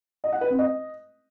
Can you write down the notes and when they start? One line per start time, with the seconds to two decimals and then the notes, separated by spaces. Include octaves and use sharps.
0.24 D#5
0.32 F#5
0.41 B4
0.50 C4
0.59 D#5